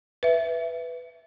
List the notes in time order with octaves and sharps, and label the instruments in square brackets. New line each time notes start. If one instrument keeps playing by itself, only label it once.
[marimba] B4 E5